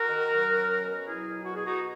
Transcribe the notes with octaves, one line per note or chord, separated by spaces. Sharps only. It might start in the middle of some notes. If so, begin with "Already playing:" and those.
Already playing: F#4 A#4
D#3
F#3
C#4
B2
F#3 E4 G#4
B2
F#4
B2 G#4
D#4 F#4